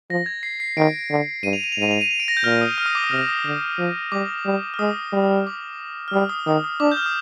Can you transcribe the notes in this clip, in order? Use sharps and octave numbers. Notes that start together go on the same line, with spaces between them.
F3 A#6
G#6
C7
C7
D#3 D7
D3
G2 D#7
F7
D#7
F7
G#2 D#7
F7
D#7
F7
D7
A#6
G6
A#2 F6
D#6
F6
D#6
D6
D#6
C3 F6
D#6
D3
F3
G3 D6
G3
F6
G#3 D#6
G3
D6
F6
G3 D#6
D#6
D#3 D#6
D#6
D4 D6
G6
F6
D#6